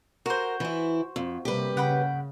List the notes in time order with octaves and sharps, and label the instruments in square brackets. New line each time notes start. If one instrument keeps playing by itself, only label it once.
[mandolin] F#4 C5 [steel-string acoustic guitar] A#4
[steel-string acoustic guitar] E3 E4
F2
[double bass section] C3 G3 A#3 [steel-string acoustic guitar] G4 B4
[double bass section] C#3 [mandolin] F#5 G5 B5